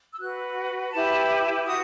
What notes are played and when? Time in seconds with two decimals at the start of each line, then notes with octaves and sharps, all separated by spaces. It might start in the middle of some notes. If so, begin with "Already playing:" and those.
0.12 E6
0.19 F#4 B4 F#6
0.92 E4 G4 B4 A5
1.66 F#4 D#6